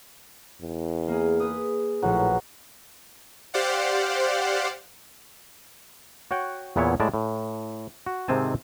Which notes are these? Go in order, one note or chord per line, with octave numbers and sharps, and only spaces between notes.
E2
A#3 G#4
G#4 B4 D#6
A#1 A2 F#3 B4 F#6
G4 C5 D5 F5 F#5
F#4 C#5 F#5 G5
E2 A#2 B3 E4 C#5
A2 G#3 D5 A5
A2
F#4
G#2 C3 D#3 C4 G#5 A5